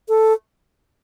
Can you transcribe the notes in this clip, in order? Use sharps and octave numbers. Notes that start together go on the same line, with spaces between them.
A4